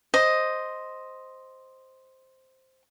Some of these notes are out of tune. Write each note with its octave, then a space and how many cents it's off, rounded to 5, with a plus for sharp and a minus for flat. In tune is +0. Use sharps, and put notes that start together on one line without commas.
C5 +0 D#5 +0